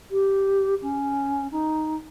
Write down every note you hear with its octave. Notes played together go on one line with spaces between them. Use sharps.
G4
C#4
D#4